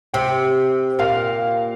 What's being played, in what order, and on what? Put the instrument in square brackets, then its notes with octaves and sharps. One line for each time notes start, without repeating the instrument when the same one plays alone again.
[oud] C3 [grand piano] G5
[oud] A#2 [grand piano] F5